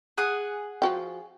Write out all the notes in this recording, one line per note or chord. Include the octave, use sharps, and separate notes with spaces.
G#4 F#5 D#6
F3 F#4 G5